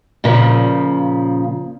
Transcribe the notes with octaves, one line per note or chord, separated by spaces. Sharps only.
A#2 C#3 E3 F3